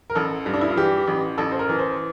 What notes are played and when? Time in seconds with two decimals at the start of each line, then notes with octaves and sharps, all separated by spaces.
0.10 A#4
0.15 A1 A4
0.46 G2
0.54 D4
0.61 E4
0.69 F4
0.77 E3 G4
1.08 A1
1.38 A1 A4
1.52 C5
1.59 A#4
1.69 E3
1.79 C5